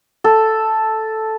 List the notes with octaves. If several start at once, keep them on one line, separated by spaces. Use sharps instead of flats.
A4